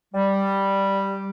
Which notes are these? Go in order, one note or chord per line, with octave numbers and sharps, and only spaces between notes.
G3